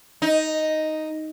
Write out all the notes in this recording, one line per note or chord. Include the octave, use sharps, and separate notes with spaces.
D#4